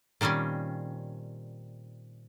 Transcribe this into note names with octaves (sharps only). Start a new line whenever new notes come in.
A#2 D#3 G3 C4 C#4